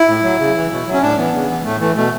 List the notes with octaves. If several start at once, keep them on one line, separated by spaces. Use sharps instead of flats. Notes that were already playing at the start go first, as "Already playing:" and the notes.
Already playing: E4
A2
F#3
C#3
E3
B2
F#3
C#4
A2 D4
E3 B3
C#3
E3
A2 A3
E3 A3
B2 A3